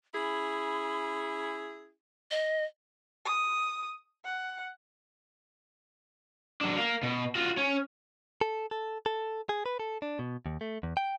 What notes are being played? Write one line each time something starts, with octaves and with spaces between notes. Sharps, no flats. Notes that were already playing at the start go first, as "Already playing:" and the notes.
C#4 E4 G#4 B5
D#5
D#6
F#5
F#3 D4
A#4 F5
B2
F4 F#4
C#4
A4
A4
A4
G#4
B4
A4
D4
B2
D#2
A3
E2
G5